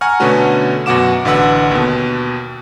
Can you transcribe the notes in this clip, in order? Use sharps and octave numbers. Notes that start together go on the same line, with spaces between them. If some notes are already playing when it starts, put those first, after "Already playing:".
F#5 G#5 A#5 C#6 F6
B2 D3 A3 B3 C#4 F#4
F#2 B2 F#4 F#5 D6 E7
A1 D3 B4 F#5 E6
D#2 B2